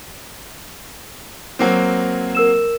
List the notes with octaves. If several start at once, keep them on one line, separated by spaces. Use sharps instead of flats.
F#3 A#3 C4
A#4 E6 E7